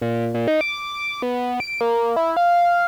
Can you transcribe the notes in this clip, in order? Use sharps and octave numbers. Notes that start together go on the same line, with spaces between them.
A#2
A#2
D#4
D6
B3
D7
A#3
E4
F5